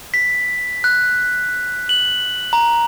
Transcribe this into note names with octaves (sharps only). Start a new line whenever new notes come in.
B6
F#6
F#7
A#5